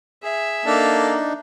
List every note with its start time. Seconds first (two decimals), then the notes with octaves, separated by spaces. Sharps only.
0.23 G#4 E5
0.66 A#3 D4 D#4 A4